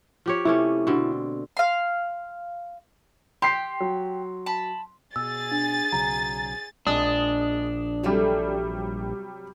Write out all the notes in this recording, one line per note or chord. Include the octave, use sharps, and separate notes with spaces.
F3 G4 C#5
C3 A3 C#4 E4
B2 D3 C4
F5 C6
G4 C6 C7
F#3
A5 B5
B2 G#4 G#5 E6 A6
D4
B1 C#3 F#3 A#5
A#1 G#3 D4 D#6
C3 F#3 G3 A3 G#4